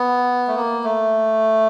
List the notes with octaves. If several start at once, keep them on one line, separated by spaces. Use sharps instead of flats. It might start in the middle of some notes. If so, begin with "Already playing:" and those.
Already playing: B3
A3
A#3
A3